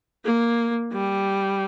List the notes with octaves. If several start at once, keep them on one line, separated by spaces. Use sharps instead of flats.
A#3
G3